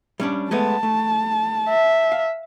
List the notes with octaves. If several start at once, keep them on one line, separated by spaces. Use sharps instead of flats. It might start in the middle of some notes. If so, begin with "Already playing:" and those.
G3 C#4 D4
G#3 A3 B3 A5
A3
E5
F5